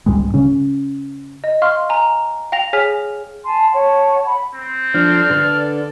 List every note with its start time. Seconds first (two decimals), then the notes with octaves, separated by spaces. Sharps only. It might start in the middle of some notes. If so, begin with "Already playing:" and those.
0.06 C#2 G#2 G3 G#3
0.34 C#3 C#4
1.44 D#5
1.62 F5 C6 C#6 F6
1.89 G#5 A#5
2.52 F5 G5 A#6 F7
2.73 G#4 C#5 G#5 F6 B6 F7
3.43 G#5 A5 C6
3.72 C#5 F#5 A5
4.25 F#5 B5
4.55 C4
4.94 F3 D4 A4 D5 F6
5.30 D3 B4